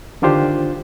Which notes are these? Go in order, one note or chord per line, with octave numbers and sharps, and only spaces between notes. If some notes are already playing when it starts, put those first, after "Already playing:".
D3 D#3 D4 F4 G4 C5